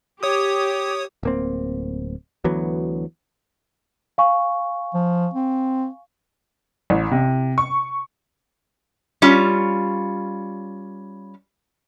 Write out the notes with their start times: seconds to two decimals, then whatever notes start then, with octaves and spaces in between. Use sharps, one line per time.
0.23 G4 C#5 D#6
1.23 D1 A#3 C4
2.44 D2 E3 F#3 B3
4.18 F5 G#5 C#6
4.94 F3
5.34 C4
6.90 A1
7.11 C3
7.58 C#6
9.22 G3 C#4 F4